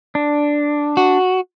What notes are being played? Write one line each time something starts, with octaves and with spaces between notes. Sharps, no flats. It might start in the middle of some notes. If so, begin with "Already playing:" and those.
D4
F#4